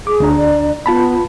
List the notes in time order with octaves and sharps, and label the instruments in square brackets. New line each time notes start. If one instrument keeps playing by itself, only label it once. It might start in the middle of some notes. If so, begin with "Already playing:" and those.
[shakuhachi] G#4 [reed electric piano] D6
[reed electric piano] D2 D4 A#5
[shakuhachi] D5
[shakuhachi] B3 [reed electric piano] F4 A5 B5